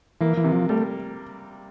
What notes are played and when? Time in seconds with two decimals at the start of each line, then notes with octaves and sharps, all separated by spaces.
0.21 E3 A#3
0.37 E3
0.44 C3
0.52 F3
0.69 G3 A3